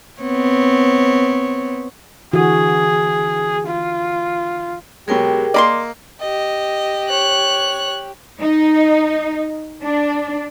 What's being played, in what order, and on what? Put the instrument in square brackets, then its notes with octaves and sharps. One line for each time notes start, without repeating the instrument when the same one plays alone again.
[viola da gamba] B3 C4 C#5
[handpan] D3 E3 F#4 [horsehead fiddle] G#4
[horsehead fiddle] F4
[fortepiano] B2 F#3 G#3 [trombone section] G4 [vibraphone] G#4 A#4 G5
[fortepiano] A#3 D#5 [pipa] D5 B5 C6
[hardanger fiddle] G4 [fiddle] D#5
[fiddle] C#5 F#6
[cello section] D#4
D4